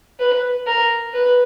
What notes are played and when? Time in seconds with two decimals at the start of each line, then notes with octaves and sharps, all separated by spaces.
0.20 B4
0.66 A#4
1.14 B4